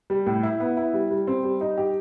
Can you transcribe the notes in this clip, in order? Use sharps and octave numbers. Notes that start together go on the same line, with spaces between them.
G3
A2
E4
B3
E4
G3
G3
C4
G3
D#4
G4